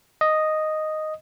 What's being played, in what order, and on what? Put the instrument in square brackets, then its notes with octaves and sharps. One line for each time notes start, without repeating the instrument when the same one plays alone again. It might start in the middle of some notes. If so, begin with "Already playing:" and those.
[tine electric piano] D#5